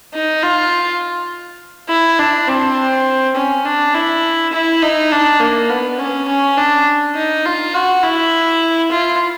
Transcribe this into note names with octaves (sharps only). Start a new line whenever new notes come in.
D#4
F4
E4
D4
C4
C#4
D4
E4
E4
D#4
D4
A#3
B3
C#4
C#4
D4
D#4
F4
F#4
E4
F4